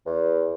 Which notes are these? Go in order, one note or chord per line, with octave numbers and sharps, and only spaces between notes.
E2